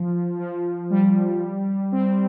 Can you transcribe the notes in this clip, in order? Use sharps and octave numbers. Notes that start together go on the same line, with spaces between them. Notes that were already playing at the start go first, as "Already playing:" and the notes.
Already playing: F3
F3
G3
C4